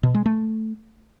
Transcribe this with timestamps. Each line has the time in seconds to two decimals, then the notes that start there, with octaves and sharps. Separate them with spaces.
0.03 B2
0.14 G#3
0.26 A3